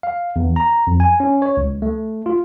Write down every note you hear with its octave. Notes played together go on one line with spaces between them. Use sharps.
F5
E2
A#5
F2
G#5
C#4
C#5
C#2
A3
F4